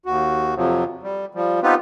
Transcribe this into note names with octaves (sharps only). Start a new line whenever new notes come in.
D#2 F#4
F2 C3 F3 F#3
G3
F3 G3
B3 C4 D#4 F4 G4 B4